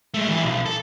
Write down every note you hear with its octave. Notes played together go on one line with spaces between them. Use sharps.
G#3 A3
D3 E3
B1
A4